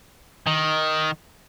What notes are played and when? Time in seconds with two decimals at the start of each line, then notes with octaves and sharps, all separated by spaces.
0.47 D#3